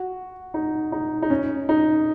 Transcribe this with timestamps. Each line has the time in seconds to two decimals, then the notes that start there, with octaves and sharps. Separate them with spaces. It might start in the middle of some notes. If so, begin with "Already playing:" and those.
Already playing: F#4
0.54 D#4
0.92 D#4
1.22 D#4
1.30 C#4
1.69 D#4